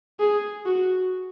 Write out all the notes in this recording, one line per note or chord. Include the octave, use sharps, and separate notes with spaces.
G#4
F#4